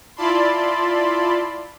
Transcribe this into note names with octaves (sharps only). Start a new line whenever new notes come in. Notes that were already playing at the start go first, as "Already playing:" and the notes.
E4 F4 D5 A5 B5 C6